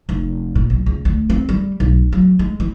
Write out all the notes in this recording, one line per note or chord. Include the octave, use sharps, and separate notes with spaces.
F1
A#2
B1
C#2
D2
C4
G3
B1
F#3
G#3
E3